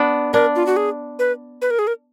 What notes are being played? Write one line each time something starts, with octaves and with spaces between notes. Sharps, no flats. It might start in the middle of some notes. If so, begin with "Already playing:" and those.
Already playing: B3 D4
D4 A#4
F4
F#4
G#4
B4
B4
A#4
G#4
A#4